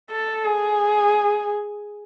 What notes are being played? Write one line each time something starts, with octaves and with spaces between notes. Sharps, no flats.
A4
G#4